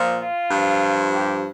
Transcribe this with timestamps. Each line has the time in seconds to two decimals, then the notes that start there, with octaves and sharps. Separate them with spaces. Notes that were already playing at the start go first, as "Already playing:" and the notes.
Already playing: A#2 F3
0.21 F4
0.50 G2 F3
1.12 G4